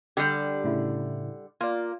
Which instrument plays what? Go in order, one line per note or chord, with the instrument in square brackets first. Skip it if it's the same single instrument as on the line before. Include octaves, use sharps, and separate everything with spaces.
[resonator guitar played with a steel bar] D3 G3 [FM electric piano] G4
[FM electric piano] A2 C#3 E4
[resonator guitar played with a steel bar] A#3 [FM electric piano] F4 D5